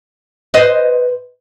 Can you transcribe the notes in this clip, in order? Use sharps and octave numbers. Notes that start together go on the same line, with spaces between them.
B4 C5 D#5